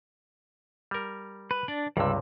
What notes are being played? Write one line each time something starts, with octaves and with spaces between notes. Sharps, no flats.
G3 A#4
B4
D4 D5
C#2 G2 C3 G3 E6